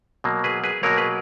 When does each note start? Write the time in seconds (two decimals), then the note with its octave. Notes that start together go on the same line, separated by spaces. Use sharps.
0.24 B2 F#3 A#3
0.44 G#4 B4
0.64 G#4 B4
0.83 B2 F#3 A#3 A#4 C#5
0.97 G#4 B4